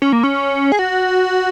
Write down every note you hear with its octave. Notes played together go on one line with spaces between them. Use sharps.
C#4
A#3
C#4
G#4
F#4